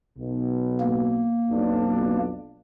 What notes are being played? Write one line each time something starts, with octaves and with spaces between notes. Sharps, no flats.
B1 B2
A#3
B1 F2 D4